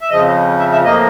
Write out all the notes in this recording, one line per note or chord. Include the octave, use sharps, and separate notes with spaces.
E5
F2 C#3 F3 D#5
E5
E5
A2 F3 A#3 D#5